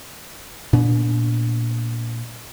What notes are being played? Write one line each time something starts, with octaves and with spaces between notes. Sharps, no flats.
A#2 B3 D4